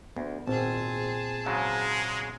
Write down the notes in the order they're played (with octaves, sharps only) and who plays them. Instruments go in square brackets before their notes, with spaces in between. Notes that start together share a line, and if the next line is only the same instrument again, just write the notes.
[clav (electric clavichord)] D2 [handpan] B3
[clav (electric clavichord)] G#1 [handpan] A#2 C4 [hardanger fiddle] G#4 A5
[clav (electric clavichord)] G#2 C#3 F#3 [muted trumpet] G#3